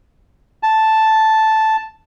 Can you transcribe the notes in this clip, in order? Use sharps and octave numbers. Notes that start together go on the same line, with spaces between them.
A5